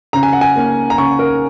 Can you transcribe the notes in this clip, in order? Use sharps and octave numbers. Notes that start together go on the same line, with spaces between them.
C#3 A#5
G#5
F#5
G#5
A#3 C#4
A#5
C#3 C#6
A#4